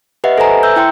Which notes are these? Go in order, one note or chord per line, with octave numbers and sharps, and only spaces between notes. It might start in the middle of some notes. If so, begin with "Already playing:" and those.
G4 B4 D#5 E5 F#5
A4 B4 C5 G#5 A#5
E5 E6 G6
E4 G5 A#5 C6 C#7